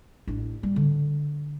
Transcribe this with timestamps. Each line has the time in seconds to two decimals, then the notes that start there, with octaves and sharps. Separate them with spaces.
0.27 A1 D4
0.63 G3
0.76 D3